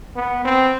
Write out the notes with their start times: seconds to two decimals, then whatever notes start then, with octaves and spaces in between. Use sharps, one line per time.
0.16 B3
0.45 C4